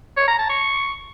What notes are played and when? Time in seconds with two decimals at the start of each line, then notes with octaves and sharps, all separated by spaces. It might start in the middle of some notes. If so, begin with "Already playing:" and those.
0.17 C#5
0.28 A#5
0.39 A5
0.49 C#6